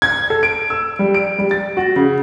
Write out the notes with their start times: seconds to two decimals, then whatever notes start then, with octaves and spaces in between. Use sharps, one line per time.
0.02 G#6
0.30 A4
0.43 D7
0.70 E6
0.99 G3
1.14 D7
1.38 G3
1.51 A6
1.77 F#4
1.96 C#3